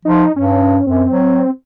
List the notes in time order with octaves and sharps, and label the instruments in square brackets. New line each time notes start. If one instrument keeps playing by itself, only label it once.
[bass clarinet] F3 [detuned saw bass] D#4
[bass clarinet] G2 [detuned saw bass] C#4
[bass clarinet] F#2 [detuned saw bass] C4
[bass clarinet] F#3